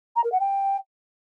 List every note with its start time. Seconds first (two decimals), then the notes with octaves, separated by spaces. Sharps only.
0.16 A#5
0.24 A#4
0.32 F#5
0.40 G5